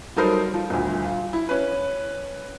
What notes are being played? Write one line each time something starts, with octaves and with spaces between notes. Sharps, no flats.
F#3 G3 D#4 A4 A#4 C5
F3
D#1 D2
F4
E4
C#4 B4